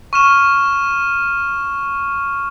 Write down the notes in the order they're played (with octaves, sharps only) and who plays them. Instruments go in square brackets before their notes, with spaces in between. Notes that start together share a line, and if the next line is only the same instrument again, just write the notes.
[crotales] C#6 F6 E7